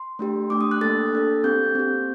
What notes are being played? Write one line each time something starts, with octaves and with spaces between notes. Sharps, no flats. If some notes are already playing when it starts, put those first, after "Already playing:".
Already playing: C6
A3 D4 G4
A3 D4 G4 D6
D#6
F#6
A#3 D4 A4 A6
A#3 D4 A4
C4 G4 G6
C4 G4